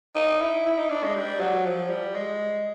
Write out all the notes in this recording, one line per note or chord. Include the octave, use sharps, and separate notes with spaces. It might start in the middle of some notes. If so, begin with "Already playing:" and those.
D#4
E4
E4
D#4
D4
G#3
G3
F#3
F3
G3
G#3